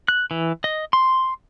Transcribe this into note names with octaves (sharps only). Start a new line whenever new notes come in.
F#6
E3
D#5
C6